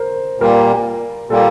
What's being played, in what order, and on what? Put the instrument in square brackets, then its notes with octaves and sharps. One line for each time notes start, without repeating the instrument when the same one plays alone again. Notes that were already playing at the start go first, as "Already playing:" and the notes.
Already playing: [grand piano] A#4 C5
[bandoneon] A#2 G3 A#3 [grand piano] A#4
[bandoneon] A#2 G3 A#3 [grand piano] A4